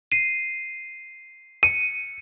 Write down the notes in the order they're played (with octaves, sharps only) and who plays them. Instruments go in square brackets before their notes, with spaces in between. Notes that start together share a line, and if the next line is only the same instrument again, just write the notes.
[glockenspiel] C7 D#7
[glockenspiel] C#7 [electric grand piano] D#7